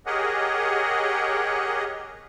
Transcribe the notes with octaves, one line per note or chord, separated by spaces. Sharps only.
G4 G#4 A#4 C#5 D#5 F#5